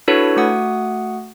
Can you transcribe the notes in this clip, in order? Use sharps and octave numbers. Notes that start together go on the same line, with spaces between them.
D4 E4 F#4 A4 B4 C#5
A3 F#4 F#5 D#6